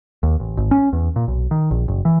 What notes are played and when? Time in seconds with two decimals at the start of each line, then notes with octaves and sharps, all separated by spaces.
0.23 D#2
0.40 A1
0.57 G#1
0.71 C#4
0.93 E2
1.16 A#2
1.28 B1
1.51 D#3
1.71 A#1
1.88 F#1
2.05 E3